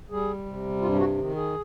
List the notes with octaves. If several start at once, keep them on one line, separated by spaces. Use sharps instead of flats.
G3 G#4
C3
G2 F4
F#4
D#3
G#4